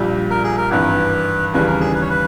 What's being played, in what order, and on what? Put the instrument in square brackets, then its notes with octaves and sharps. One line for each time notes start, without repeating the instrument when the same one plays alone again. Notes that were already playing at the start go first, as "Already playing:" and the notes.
Already playing: [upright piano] A#1 A#2 G3
[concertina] A#4
G#4
A#4
[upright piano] G#1 G2 E3 [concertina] B4
[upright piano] D#2 C#3 E3 G3 [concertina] B4
[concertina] A#4
G#4
B4
C#5
B4